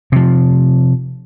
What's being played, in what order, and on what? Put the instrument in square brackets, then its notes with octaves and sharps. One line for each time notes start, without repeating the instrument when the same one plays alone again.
[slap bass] C3 F3